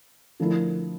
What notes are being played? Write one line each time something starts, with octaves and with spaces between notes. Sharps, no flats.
D3 F3 A3 E4 A#4